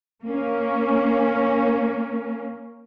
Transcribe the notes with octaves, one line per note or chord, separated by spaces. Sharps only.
A#3 C#4